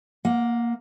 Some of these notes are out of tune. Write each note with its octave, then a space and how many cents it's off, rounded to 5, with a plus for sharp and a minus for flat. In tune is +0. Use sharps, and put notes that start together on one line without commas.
A#3 +5 F#5 -30